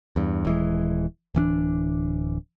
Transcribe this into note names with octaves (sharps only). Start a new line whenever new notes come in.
E2 G2
D#1 E3 G#3
D1 E3 C#4 D4